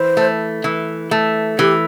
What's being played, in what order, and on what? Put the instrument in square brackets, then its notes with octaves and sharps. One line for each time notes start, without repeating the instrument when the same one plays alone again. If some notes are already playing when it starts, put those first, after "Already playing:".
Already playing: [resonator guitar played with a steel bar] E3 [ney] C5
[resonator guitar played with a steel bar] A3
E3
A3
[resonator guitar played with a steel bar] E3 [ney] G4